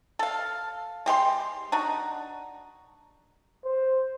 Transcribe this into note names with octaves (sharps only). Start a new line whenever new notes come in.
A4 F5
G#3 G4 B4 C6
D4 D#4 F#4
C5